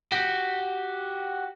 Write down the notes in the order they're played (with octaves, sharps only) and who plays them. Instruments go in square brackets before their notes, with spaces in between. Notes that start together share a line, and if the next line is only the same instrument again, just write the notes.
[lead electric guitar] F#4 G4